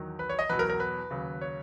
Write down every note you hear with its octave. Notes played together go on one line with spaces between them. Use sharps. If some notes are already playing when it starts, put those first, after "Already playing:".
Already playing: E2 D#3 F#3
B4
C#5
D#5
E2 B2 F#3 B4
A#4
A#4
B4
D#2 C#3 F#3
C#5